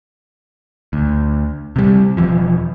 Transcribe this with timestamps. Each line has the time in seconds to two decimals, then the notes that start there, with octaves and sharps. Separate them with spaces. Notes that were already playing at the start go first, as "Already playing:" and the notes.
0.93 D2
1.76 C3 G3
2.17 E1 E3 F3